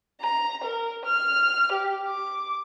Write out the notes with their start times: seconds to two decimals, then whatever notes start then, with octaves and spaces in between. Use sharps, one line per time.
0.21 A#5
0.64 A#4
1.05 F6
1.72 G4
2.06 D6